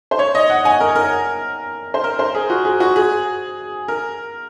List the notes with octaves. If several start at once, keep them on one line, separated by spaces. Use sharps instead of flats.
C5
C#5
D#5
F#5
G#5
A#4
A#4
C5
A#4
C5
G#4
F#4
G#4
F#4
G#4
A#4